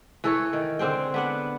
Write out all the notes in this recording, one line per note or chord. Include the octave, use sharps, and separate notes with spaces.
E3 A4 C#5
D#3
D3 C4 G#4 G5
B3 D4 F#5